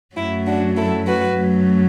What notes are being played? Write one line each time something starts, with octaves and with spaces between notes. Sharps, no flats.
F#2 F#3 A3 E4
D4 F#4
E4 A4
F#4 B4
F#2 F#3 A3